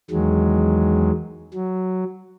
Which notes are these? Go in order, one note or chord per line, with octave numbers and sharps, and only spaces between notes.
E2 D#3 F#3 G#3
F#3